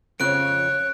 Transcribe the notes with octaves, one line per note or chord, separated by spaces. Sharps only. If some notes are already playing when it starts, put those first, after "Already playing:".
F2 C#3 F3 C#5 F#6 D7